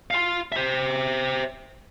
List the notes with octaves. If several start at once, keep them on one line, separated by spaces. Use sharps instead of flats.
F5 C6
C5 E5